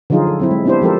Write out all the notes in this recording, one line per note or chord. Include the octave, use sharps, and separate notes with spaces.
D3 F3 F#3 D#4 F4 G#4
A4
F#3 C4 E4
G#3
B3 C4 D4 E4 G4 C5
F3 G#3 G4 A4 A#4 C5